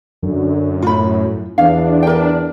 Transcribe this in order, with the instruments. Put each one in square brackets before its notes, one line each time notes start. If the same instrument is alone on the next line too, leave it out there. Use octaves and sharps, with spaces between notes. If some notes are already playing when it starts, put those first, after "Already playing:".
[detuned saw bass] F#2 [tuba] D3
[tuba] A2 [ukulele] F4 B5
[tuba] E2 [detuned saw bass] D4 [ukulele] F5
[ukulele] A#4 G5